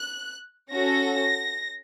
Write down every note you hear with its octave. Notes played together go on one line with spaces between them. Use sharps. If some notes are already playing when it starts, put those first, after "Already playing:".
Already playing: F#6
C#4 F#4 A4 A#6